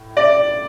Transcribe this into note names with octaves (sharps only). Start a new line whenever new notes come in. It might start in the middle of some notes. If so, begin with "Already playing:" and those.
Already playing: A2
D5